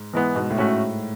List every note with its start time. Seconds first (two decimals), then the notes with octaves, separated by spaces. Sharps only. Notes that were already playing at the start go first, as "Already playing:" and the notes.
Already playing: G#2
0.13 E3 G#3 B3
0.35 G#2 B2
0.50 A2
0.58 A3 C#4 F#4